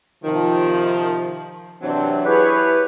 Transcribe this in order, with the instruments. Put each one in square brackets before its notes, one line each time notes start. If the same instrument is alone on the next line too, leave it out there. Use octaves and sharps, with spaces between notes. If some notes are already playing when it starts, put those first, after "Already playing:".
[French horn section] C3 F3 [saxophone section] D#3
[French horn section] C3 C4 D4 [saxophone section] E3 F#3
[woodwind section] E4 G4 B4 [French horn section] G#4 C#5